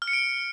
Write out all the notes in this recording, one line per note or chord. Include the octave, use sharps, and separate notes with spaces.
F6
C#7
D7